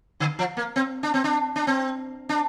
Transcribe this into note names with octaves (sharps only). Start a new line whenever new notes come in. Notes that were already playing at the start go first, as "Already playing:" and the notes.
D3
F3
A#3
C4
D4
C4
D4
D4
C4
D4